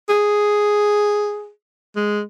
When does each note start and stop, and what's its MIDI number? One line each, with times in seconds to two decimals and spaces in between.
0.09 1.50 68
1.96 2.21 56